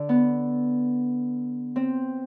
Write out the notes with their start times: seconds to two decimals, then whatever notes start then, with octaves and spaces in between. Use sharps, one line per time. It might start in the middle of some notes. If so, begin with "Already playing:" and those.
Already playing: D3
0.09 B3
1.76 C4